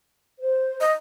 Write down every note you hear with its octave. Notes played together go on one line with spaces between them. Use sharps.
C5
D#5